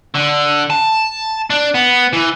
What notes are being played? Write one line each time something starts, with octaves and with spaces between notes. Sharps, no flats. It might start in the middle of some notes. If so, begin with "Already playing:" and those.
D3
A5
D4
B3
E3